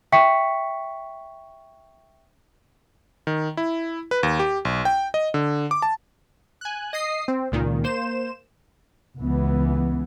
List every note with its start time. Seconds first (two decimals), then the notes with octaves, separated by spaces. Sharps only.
0.12 E5 G5 C#6 B6 C#7
3.27 D#3
3.57 E4
4.11 B4
4.23 D#2
4.39 G4
4.65 B1
4.85 G5
5.14 D#5
5.34 D3
5.71 D6
5.82 A5
6.61 G#5 F#6
6.93 D#5 D#6 C7
7.28 C4
7.52 C#2 A#2 D#3
7.84 A#3 C5 E7
9.19 C#2 E3 B3